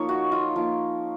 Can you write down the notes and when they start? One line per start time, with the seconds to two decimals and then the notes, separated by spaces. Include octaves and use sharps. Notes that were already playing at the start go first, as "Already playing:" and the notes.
Already playing: F3 A#3 D#4 C#5
0.09 F#4
0.32 F4
0.56 F3 A#3 F4